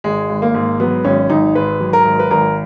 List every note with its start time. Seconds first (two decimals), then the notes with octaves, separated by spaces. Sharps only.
0.04 G#1 G#3
0.29 G#1
0.42 A#3
0.54 G#2
0.80 F#3 B3
1.05 G#1 C#4
1.30 G#1 D#4
1.55 G#2 B4
1.80 F#3
1.93 A#4
2.05 G#1
2.19 B4
2.31 G#1 A#4